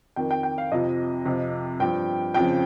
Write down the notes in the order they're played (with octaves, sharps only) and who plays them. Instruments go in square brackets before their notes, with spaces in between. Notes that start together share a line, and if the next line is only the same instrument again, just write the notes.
[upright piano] F2 D#3 G5
G5
G5
F5
F2 C3 F3 D#5
F2 C3 F3
G2 F3 G5
F2 C#3 F3 G5